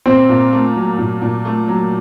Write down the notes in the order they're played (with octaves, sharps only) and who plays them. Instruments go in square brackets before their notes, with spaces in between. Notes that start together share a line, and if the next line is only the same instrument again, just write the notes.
[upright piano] A#2 [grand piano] C4
[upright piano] A#2
A3
F#3
A#2
A#2
A3
F#3